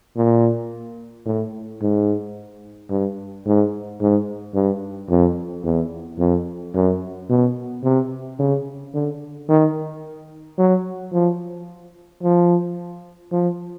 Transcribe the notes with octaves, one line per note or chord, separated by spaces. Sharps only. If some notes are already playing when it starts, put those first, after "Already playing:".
A#2
A2
G#2
G2
G#2
G#2
G2
F2
E2
F2
F#2
B2
C3
C#3
D3
D#3
F#3
F3
F3
F3